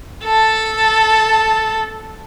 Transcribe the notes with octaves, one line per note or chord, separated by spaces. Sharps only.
A4 A5